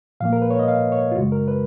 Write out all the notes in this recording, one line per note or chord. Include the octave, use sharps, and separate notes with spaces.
A#2 F3 A#3 F5
A#4
B4
C#5
D#5
F5
C#5
F4
F#2 C#3 G#3 F#4
A#4
B4